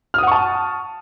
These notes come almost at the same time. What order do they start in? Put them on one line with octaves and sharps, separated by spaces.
F6 D#6 F#5 C#6 A5